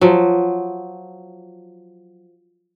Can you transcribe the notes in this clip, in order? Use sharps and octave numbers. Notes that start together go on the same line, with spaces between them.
F3 F#3